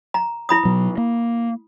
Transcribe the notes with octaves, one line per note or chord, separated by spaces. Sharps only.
A#5
E4 B5 D#6
B2 F#3
A#3